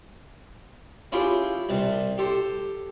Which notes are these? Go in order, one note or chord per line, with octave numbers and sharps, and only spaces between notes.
C#4 E4 F4 G4 G#4 G5
C2 C3 A5
G4 A4 C5